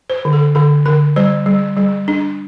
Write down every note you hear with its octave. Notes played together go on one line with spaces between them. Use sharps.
C5
D3
A4
D3 A4
D3 A#4
G3 C5
G3
G3
D4